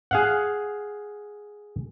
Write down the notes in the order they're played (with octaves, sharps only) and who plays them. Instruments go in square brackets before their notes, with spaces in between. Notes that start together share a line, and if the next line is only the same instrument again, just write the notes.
[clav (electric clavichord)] G#4 F5 F#5